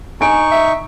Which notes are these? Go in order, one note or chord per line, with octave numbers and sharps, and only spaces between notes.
D#4 G#5 C#6 D7
E5